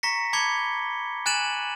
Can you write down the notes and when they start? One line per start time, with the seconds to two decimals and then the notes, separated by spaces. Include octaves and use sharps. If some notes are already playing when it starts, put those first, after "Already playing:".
0.03 A#5 C#6 A#6 B6 C#7
0.33 A5 B5 D6 G#6 C#7 G7
1.26 G#5 F#6 A6 D#7 E7 F#7